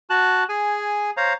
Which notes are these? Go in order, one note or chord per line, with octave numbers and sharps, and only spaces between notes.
F#4 A5 F#6
G#4 G#5
C5 C#5 F5 A#5